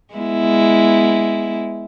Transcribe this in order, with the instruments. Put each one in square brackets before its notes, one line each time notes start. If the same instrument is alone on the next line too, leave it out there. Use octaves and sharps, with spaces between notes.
[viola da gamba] G#3 B3 E4